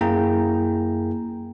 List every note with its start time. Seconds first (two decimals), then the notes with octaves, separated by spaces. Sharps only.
0.01 F#2 A#3 E4 G#4 G5 A#5